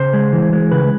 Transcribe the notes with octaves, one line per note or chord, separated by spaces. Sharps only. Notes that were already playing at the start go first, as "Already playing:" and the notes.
Already playing: C#3 C5
G#3
E3
G#3
C#3 B4